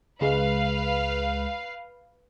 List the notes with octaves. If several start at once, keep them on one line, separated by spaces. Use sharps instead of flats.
C#2 G#3 B4 F5